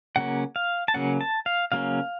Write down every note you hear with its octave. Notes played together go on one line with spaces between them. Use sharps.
C#3 F#3 A#3 C#4 F#5
F5
A5
C#3 F#3 A#3 C#4 F#5
A5
F5
C#3 F#3 A#3 C#4 F5